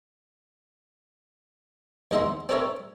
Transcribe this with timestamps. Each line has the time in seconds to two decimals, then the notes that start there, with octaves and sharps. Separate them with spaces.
2.11 D#2 G#3 D#5 E5 F#5 C6
2.49 C4 D4 A4 A#4 C#5 E5